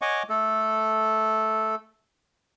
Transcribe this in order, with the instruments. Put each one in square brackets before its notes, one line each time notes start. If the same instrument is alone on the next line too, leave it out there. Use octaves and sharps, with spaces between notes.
[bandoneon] C#5 D#5 F#5 G#5 C#6 D6
A3 A4